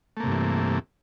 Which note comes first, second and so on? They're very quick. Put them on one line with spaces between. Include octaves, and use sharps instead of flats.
A3 A#3 C3 G2 E3